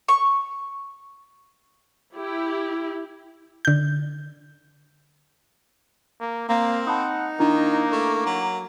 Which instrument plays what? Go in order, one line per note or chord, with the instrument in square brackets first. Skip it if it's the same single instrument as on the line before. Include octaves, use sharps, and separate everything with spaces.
[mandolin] C#6
[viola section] E4 G4
[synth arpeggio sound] D3 G6
[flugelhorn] A#3
[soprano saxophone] A#3 [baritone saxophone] C4 [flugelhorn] A#4
[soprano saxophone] D#4 [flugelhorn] F#5 [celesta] A5 B5 D#6
[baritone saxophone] D#3 [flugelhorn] A#3 [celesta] D4 E4 A#5
[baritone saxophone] A3
F#3